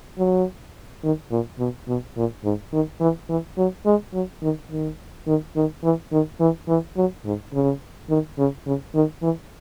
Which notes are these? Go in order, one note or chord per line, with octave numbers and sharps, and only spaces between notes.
F#3
D#3
A#2
B2
B2
A#2
G#2
D#3
E3
E3
F#3
G#3
F#3
D#3
D#3
D#3
D#3
E3
D#3
E3
E3
F#3
G#2
C#3
D#3
C#3
C#3
D#3
E3